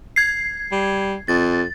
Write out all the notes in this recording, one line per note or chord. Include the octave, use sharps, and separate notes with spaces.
G#6 C7
G3
F2 A6